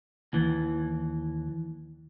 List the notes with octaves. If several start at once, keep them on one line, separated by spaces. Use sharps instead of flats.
D#2 E3